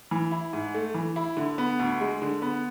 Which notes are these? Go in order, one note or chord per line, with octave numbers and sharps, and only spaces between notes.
E3
E4
G#2
A3
E3
E4
D3
B3
D2
G#3
D3
B3